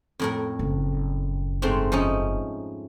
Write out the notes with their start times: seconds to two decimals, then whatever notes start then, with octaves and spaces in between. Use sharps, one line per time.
0.19 F2 A2 A#4
0.59 F#1
1.62 G#2 A3 C4
1.92 F3 C#4 D#4